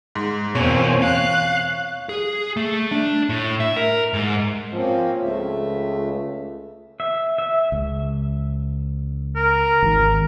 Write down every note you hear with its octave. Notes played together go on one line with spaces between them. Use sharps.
G#2
E2 B2 A#3 C4 C#4 C#5
F5 F#6
G#4
A3
D4
A2
E5
A#4
G#2
F3 A#3 C4 C#4
C#2 A3 E5
E5
E5
C#2
A#4
G#1 D#3